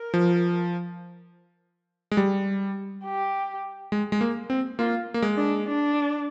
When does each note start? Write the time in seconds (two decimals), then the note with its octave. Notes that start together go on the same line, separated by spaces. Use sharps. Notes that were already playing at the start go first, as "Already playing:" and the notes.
Already playing: A#4
0.14 F3
2.11 G#3
2.17 G3
3.04 G4
3.92 G#3
4.12 G#3
4.21 A#3
4.50 C4
4.79 A#3 F4
5.14 A#3
5.22 G#3
5.37 D4
5.66 D4